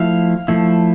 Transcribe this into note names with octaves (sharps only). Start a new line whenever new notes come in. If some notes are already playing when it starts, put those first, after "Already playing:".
Already playing: F3 A3 E4 F5
F3 A3 E4